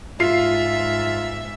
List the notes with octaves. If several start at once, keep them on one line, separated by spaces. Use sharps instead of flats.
G#2 F4 E5 C7